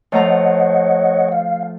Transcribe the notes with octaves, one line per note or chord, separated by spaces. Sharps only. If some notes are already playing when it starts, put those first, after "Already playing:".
F3 A3 C#5 D#5 F#5 A#5
F5